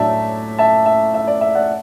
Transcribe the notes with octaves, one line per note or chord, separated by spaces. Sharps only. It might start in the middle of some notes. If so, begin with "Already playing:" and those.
Already playing: A2 F#3 A3 D4 D5 E5 A5
E5 A5
E5
E5
D5
E5
D5 F#5